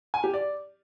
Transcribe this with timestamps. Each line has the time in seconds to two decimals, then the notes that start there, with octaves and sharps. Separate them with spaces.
0.14 G#5
0.24 G4
0.34 D5